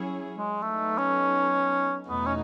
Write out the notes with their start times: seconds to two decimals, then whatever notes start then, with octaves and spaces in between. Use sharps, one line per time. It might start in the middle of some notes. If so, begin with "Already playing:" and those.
Already playing: F#3 C#4 E4 G#4 C#5
0.37 G#3
0.61 F#3 A3 B3 D#4 A4
0.98 C#4
2.08 E2 B2 A3 B3 D#4 F#4
2.26 C#4